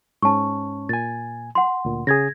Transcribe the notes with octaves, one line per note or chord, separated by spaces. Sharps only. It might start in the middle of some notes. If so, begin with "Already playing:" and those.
G#2 C#4 A5 C#6
A#2 G#5 A6
F#5 C6
D2 A#2
C#3 G#4 G#6 A#6